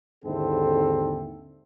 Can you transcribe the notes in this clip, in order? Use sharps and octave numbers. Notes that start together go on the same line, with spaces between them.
D#2 G#2 D3 C4 E4 A4